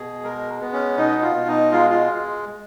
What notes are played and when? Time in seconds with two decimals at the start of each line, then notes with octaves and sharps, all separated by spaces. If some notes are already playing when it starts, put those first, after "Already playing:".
Already playing: B2 G#4
0.24 G#3 A#4
0.61 B3
0.73 C#4
0.98 B2 D#4
1.22 F4
1.35 B2
1.48 D#4
1.72 G#3 F4
1.90 F4